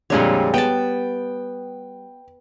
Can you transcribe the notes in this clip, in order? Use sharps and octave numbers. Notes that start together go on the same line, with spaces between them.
F2 A#2 D3 G3 G#3 C#5
B3 G5 A5